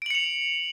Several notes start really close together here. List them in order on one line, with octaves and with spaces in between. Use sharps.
D7 F#7 C#7 F7